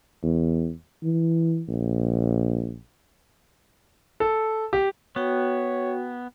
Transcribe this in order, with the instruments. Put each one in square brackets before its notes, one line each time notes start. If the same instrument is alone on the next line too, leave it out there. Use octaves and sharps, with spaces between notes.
[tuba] E2
E3
A#1
[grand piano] A4
G4
[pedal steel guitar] B3 [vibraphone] F#4 G5 [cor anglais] C#5